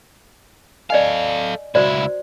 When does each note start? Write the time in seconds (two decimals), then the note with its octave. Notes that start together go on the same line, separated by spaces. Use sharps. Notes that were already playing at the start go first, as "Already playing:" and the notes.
0.90 A4 D5 D#5 F5 G#5
1.75 C#2 E4 F#4 C5 D5